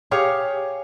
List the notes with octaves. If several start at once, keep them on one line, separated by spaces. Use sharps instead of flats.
G4 G#4 C#5 F5